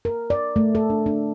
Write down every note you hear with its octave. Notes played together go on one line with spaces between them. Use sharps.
A#4
D5
A3
A4
D4
D4